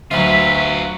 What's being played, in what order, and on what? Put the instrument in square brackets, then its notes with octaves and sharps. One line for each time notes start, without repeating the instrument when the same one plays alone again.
[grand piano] D2 [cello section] F#3 [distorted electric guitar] F4 B4 [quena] E5